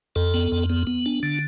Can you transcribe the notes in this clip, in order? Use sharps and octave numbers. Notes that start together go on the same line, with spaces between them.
F2 A4
B3
F2
B3
B3
D4
D3